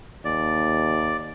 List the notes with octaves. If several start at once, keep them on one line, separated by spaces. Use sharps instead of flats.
D#2 D5